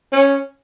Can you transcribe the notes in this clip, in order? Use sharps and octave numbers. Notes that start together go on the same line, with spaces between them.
C#4